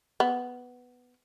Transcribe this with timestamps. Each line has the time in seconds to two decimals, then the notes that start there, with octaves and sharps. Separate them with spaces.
0.20 B3